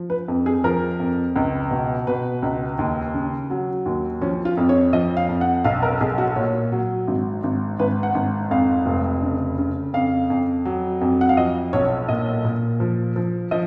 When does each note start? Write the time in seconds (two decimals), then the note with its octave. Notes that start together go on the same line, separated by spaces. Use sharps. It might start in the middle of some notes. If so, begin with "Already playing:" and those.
Already playing: F3
0.10 B4
0.28 F2
0.46 G#4
0.64 F3 A#4
1.00 F2
1.36 C#2
1.71 B2
2.07 B2 B4
2.42 C#2
2.79 D#2
3.14 C#3
3.50 F#3
3.86 D#2
4.22 F3 C#4
4.45 F4
4.57 F2
4.69 C#5
4.93 F3 D#5
5.17 F5
5.29 F2
5.41 F#5
5.64 B1 F5
5.83 A#4
6.00 B1 G#4
6.18 F#4
6.36 A#2 C#5
6.72 F#3
7.07 G#1
7.43 G#1
7.79 G#1 B4
8.03 F#5
8.15 G#1
8.51 F2 F5
8.86 F1
9.23 C#3
9.58 C#3
9.94 F2 F5
10.30 F2
10.65 F#3
11.01 F2
11.21 F#5
11.29 F5
11.37 F3 D#5
11.73 B1 C#5
12.08 A#2 D#5
12.45 A#2
12.80 F3
13.16 F3
13.51 F3 D#5